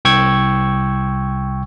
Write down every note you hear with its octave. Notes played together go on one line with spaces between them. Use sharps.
C2 G5 C#6 E6 G#6